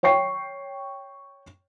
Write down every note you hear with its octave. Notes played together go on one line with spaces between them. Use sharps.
C#5 G5 C#6 C7